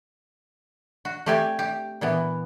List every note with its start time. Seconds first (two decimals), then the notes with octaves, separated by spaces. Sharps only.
1.05 F#4
1.26 A3 C4 G4 D5 G#5
1.59 G4
2.01 A#2 E3 B3